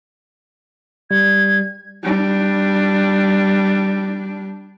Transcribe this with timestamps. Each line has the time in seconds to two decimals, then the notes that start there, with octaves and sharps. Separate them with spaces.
1.11 G3 G#6
2.03 G3 D4